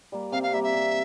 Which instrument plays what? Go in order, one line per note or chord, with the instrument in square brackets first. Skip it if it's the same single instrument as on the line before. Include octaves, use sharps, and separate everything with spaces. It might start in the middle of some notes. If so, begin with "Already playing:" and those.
[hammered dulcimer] G3 A#3
[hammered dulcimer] C3 [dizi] F5
[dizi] F5
[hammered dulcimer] G3 A#3 [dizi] E5
[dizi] E5
[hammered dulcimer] C3